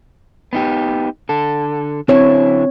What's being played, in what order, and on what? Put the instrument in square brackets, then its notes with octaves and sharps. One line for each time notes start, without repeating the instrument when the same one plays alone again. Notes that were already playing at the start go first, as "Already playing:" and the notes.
[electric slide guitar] B3 D#4 G4
D3 A4
[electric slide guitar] D3 F#3 E4 [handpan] C4 C#5